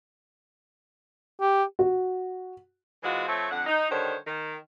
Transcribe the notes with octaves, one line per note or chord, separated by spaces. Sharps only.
G4
F#4
E3 G#3 C4 F4 F#4
F3 A3 C4 C#5 E5
F2 D3 F#5
D#4
D3 D#3 G3 C5 C#5
D#3